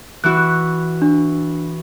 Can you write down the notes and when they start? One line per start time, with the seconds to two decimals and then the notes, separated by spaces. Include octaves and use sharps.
0.24 E3 E4 F#4 F#6
1.02 D4